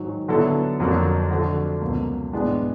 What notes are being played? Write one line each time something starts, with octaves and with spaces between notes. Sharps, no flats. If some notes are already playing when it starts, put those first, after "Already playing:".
Already playing: G#2 D#3 F#3
D3 F#3 B3 E4 A4
F2 D3 F#3 A#3
D3 F3 A3 D4 F#4
C#2 B2 F#3 A#3
A2 E3 G#3 B3 D4